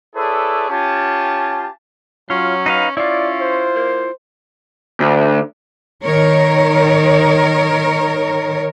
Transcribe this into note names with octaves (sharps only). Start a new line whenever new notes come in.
E4 G#4 A4 B4 C#5 D5
C#4 F4 G4 G#5 A5
F#3 C#4 F4
D#4 B4 F5
C#4 E4 F4 D5
C5
A#3
D2
D#3 A#4 C#5